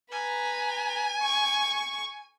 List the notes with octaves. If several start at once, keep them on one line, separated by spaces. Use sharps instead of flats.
B4 G#5 A#5
C#6